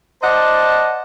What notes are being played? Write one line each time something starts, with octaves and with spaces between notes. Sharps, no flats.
C5 D5 D#5 F#5 A5